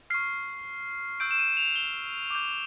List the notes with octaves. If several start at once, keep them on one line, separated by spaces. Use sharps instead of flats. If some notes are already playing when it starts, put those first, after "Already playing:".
C#6 F6 C7
C#6 E6 G6 D7
E7
D#7
F7
G7
D6 G6